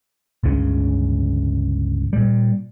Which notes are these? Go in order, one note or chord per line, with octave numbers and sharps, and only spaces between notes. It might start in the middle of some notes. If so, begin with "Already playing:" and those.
G1 C#2 C#3 C#4
A#2 G3